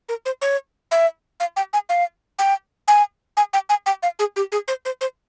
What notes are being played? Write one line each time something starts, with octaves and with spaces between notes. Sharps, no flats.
A#4
C5
C#5
E5
F5
G5
G#5
F5
G5
G#5
G#5
G5
G#5
G5
F5
G#4
G4
G#4
C5
C5
C5